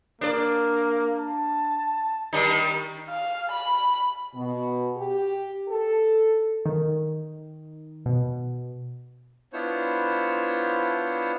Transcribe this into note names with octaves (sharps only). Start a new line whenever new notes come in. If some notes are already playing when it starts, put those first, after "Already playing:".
A#3 D4 D5
A5
D#3 G3 D#4
F5
B5
B2
G4
A4
D#3
B2
B3 D4 E4 F4 C5 C#5